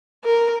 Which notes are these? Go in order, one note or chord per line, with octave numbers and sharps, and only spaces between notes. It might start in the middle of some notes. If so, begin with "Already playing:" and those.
A#4